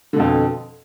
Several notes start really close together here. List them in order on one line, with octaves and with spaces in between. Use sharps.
D3 B2 F2